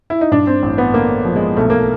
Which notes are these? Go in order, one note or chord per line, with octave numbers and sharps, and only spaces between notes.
E4
D#4
G2 D4
C4
A1
B3
D3 A#3
F3
G#3
B1 A3
A#3